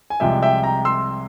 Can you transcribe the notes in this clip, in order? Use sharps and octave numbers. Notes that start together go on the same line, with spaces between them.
G#5
C2 C3 F3 G#3 E5 G5
E5 G5
G5 A#5
C6 E6